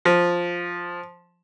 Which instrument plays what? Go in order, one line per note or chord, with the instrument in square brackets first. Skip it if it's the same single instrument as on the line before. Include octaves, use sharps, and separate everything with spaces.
[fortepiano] F3